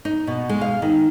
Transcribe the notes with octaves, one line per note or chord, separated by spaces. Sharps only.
D#4
B2
G#3
F5
D#3